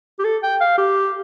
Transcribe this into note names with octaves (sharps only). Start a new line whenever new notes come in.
G4
A4
G5
F5
G4